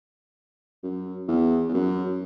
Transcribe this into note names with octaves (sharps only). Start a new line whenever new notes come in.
F#2
E2
E2
F#2